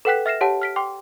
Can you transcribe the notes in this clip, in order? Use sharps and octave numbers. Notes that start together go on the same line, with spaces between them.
A4 B4 F#5 G5 F#6 B6
E5 F6 A#6 C7 E7
G4 C#5 F#5 A5
F6 B6 D7
G5 C6 D6